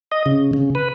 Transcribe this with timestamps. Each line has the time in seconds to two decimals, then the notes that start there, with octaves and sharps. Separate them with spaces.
0.12 D#5
0.26 C#3
0.53 C#3
0.75 B4